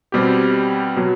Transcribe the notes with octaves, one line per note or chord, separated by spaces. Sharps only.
B2 G3 C4 G4
B2 F#3